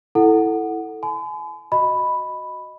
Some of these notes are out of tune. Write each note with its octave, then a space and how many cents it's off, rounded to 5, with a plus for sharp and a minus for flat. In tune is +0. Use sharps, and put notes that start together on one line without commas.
E4 +0 A4 +0 F#5 +0
G#5 +40 B5 +45
F#4 +0 D#5 +0 B5 +0